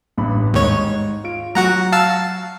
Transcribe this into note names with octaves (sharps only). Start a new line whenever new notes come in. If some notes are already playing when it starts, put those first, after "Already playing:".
A1 G2 B5
D#2 G#2 C#5
F4 D7
F#3 F#4 F#5 A#5
F5 A5 E6